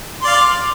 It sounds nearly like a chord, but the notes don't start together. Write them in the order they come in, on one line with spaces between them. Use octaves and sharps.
C6 D5 F5